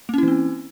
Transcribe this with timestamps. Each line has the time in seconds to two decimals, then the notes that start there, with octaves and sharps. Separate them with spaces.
0.09 A#3
0.14 C#4
0.18 E4
0.23 E3
0.28 C4